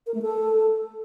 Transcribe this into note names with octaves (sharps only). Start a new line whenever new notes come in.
A#4
A3
A4